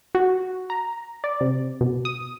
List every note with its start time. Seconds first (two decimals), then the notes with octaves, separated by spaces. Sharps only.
0.15 F#4
0.70 A#5
1.24 D5
1.41 C3
1.81 B2
2.05 D#6